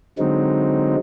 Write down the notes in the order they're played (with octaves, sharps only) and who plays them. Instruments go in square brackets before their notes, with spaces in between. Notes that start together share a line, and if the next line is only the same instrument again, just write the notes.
[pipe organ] D3 F#3 G#3 C4 D#4